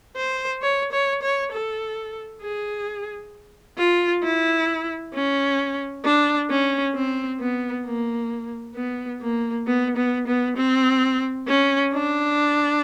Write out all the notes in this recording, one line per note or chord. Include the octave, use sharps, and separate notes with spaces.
C5
C#5
C#5
C#5
A4
G#4
F4
E4
C#4
D4
C#4
C4
B3
A#3
B3
A#3
B3
B3
B3
C4
C#4
D4